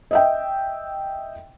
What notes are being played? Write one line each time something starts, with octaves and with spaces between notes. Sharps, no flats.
D#5 E5 G5